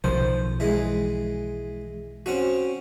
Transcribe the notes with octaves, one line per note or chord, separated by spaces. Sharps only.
B1 D#3 F3 C5
E3 G#3
C4 C#4 F#4